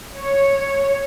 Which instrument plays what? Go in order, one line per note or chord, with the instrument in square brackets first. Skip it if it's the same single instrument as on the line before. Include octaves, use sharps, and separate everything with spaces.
[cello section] C#5